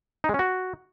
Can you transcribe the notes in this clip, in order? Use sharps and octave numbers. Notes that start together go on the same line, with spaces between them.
D#4
G#3
C#4
F#4